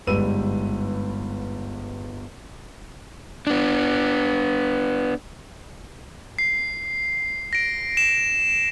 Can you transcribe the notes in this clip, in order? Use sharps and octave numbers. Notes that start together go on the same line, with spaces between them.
G1 G#2 G3 B4 E6 D#7
B3 D4
C7
A#6 D7
E7